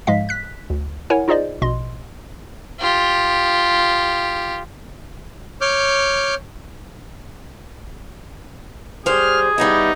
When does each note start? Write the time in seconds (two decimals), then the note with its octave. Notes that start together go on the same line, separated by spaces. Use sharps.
0.07 G#2 F3 G#3 D#5 F5 B6
0.29 F#6 B6
0.70 D2
1.10 E4 A#4 C#5 F#5 G#5
1.28 D#4 F4 G#4 C5 D5 D#5
1.62 A#1 B2 D#5 C6
2.80 F4 G4
5.61 C#5 D6 F6 G6
9.06 G3 G#4 C5 F6
9.58 G3 B3 D#4 E4